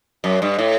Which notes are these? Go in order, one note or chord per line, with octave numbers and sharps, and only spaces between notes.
F#2
G2
A2